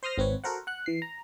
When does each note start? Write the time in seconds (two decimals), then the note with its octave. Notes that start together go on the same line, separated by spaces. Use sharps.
0.03 C5 C6 D#6 F6 A#6
0.18 G#1 C4 B4 C#5
0.44 F#4 A4 A#4 C5 F#5
0.67 F#5 F#6
0.86 E3 C7
1.02 A#5